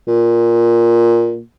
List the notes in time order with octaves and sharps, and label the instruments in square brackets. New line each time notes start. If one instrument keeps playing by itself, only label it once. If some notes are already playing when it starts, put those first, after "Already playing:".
[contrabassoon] A#2